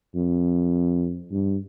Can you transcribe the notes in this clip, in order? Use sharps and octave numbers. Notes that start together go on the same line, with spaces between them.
F2
G2